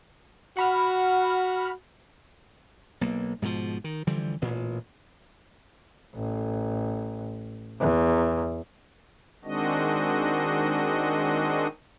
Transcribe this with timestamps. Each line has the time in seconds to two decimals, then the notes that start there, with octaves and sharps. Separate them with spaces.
0.57 F#4 F#5 B5 F6
3.01 B1 A#3
3.42 G#2 B2 D#3 F3
3.84 D#3
4.07 D3 E3 F3 G3
4.42 A1 A#2
6.15 A1
7.80 E2
9.45 D#3 G#3 C4 D4 F#4 D#5